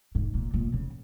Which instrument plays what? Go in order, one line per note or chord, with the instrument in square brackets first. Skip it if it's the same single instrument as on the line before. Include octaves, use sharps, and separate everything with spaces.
[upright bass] G#2
A#2
A#2
C#3